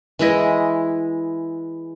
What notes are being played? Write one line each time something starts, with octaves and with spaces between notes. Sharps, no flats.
E3 G#3 E4 D#5